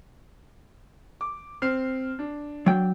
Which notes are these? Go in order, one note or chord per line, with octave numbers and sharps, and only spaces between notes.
D6
C4 F6 C7
D4
F#3 G5